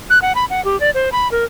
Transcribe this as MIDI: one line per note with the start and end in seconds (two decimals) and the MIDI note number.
0.10 0.19 90
0.22 0.33 78
0.35 0.45 83
0.50 0.63 78
0.65 0.79 67
0.80 0.90 74
0.94 1.09 72
1.12 1.30 83
1.32 1.45 70